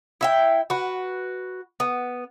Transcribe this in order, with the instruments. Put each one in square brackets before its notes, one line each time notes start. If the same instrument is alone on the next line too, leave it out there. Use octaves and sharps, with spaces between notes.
[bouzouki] E4 E5 G5
F#4 B4
B3